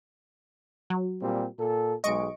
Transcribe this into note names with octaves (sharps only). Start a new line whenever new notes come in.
F#3
A#2 G3 C4
A#2 A4
B1 G#3 D#5 C#6 D7